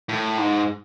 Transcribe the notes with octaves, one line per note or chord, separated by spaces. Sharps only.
A2
G#2